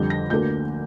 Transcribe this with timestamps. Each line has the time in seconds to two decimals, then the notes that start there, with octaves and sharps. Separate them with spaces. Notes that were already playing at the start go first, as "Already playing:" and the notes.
Already playing: F2 D3 G3 G6
0.10 A#6
0.30 D2 D3 A#3 G6